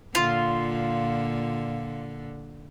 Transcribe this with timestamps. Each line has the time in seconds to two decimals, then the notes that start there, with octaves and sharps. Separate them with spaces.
0.15 A#2 D3 F4